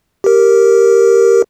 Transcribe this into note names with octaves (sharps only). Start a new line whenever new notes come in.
G4 A#4